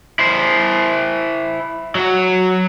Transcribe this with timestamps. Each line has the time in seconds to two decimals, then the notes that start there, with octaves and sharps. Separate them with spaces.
0.19 E4 C5
1.95 F#3 F#4